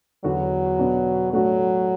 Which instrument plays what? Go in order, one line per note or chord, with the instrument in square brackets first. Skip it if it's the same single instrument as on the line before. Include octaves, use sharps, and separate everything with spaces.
[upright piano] E2 D3 B3 F#4 [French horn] F#3
[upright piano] B2 B3 D4
[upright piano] A2 A3 D4 F#4 [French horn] F#3